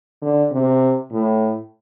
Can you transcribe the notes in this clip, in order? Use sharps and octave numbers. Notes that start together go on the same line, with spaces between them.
D3
C3
A2